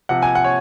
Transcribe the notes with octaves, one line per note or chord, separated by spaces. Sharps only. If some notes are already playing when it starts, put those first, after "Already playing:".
C3 F3 F#5
G#5
F#5
C#5